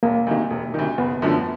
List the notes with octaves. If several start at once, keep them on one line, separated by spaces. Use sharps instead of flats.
E1 A#3
D2 C3 D#3
E1
D2 C3 D#3
F#1 B3
F#2 D3 F3 A3